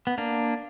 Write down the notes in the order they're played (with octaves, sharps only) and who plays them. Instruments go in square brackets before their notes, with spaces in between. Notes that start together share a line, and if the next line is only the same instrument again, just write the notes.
[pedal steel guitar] B3
A#3 D4